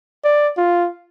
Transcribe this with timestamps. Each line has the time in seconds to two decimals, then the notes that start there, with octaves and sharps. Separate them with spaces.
0.24 D5
0.57 F4